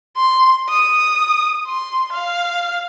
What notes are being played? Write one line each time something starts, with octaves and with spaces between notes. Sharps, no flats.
C6
D#6
C6
F5